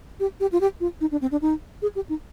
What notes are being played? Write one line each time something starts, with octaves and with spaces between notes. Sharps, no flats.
G4
G4
F4
G4
F4
D#4
D4
C4
D4
D#4
G#4
G4
D#4